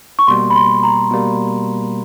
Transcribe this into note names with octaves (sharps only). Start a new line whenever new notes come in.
C#6
B2 G3 A#3 C6
B5
C6
A#5
B2 G3 A#3